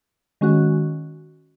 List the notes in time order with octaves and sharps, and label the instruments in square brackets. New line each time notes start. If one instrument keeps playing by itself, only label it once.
[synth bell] D#3 G#3 C#4 F#4